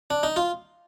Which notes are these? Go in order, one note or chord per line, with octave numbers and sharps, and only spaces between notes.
D4
D#4
F4